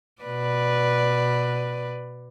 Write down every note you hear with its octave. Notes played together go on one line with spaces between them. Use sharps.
B2 B4 D5